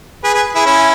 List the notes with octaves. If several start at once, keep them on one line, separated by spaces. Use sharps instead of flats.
G#4 B4
G#4 B4
E4 G#4
C#4 E4